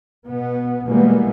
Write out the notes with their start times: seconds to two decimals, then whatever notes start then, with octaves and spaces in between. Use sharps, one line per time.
0.25 B2 B3
0.87 B2 E3 G3 G#3 A#3 B3